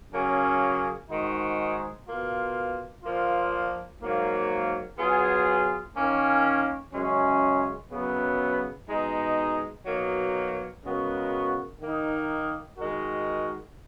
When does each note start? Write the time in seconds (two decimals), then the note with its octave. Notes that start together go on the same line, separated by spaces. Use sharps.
0.12 C#3 F#3 A#3 C#4 G#4
1.09 G#2 D#3 G#3 D#4 F#4
2.07 B2 A#3 F4
3.04 A#2 F3 A#3 F4
4.01 G#2 F#3 A#3
4.98 F#3 B3 F4 G#4
5.96 D#3 A#3 C#4
6.93 F#2 C#3 G#3 C#4
7.91 F#2 C#3 F#3 B3
8.89 B2 G#3 D#4
9.86 B2 F#3 A#3 D#4
10.84 C#3 G#3 B3 F#4 A#4
11.81 D#3 A#3 D#4
12.78 D#3 G#3 D#4 F#4 A#4